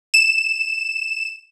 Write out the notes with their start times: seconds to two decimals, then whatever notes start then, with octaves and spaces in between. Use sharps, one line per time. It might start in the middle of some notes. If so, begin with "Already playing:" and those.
0.14 E7